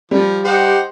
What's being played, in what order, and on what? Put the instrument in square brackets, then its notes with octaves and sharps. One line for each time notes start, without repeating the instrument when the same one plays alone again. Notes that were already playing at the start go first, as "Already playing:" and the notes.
[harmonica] F3 [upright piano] G3
[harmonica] D#4 C5 F#5 [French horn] G4